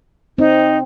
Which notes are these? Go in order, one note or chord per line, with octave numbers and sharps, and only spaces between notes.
C4 D#4